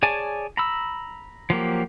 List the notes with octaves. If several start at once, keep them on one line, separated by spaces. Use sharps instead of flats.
G#4 C#5 D5 G#5 A5
A#5 B5 E6
F3 F#3 A#3 G4